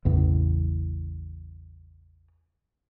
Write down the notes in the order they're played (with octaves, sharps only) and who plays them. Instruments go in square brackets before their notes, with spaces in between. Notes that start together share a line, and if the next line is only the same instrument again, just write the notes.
[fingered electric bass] A1 E2 C#3 E3